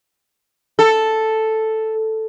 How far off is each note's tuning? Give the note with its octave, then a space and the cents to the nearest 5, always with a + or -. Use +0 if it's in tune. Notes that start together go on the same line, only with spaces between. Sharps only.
A4 +0